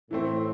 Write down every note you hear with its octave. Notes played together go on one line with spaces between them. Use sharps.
A2 E3 A3 C4